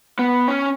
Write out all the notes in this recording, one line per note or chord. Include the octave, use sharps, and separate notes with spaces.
B3
C#4